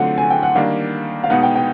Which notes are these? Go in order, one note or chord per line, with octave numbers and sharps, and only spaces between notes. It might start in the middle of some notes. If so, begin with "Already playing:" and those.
Already playing: D3 F#3 A3 C4 F4 F#5
G#5
G5
F#5
D#3 G3 A#3 D4 F5
F5
B2 G#3 B3 D#4 F#5
G5
G5